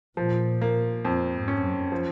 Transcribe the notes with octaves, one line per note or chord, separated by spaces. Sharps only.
A#2 F3
A#3
F2
G#2
C#4
F#2
F3